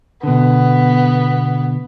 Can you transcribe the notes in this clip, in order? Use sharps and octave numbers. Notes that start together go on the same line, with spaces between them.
B2 D3 B3